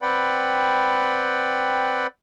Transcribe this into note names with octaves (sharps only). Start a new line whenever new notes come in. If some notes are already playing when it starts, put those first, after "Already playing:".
C4 B4 D5 F#5 G5 B5